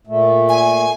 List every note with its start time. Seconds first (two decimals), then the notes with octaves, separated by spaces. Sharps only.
0.07 A#2 A3
0.49 G#5